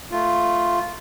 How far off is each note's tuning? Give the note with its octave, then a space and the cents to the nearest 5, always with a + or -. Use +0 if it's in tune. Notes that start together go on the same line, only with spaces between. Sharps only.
A3 +0 F4 +0